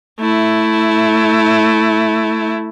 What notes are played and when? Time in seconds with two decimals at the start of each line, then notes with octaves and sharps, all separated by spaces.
0.20 A3 E4